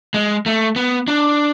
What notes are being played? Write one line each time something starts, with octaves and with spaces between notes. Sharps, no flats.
G#3
A3
B3
D4